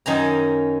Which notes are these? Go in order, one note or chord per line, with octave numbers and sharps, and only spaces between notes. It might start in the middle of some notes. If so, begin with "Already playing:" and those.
F#2 D#3 C#4 A#5